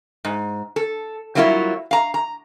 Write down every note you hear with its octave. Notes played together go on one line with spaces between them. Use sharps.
G#2
A4
F#3 G3 A#3 E4 F4 C#5
F5 A#5
A#5